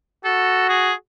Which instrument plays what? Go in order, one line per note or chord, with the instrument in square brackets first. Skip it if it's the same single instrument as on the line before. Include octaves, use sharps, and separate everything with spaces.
[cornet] F#4 [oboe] A4
[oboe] G#4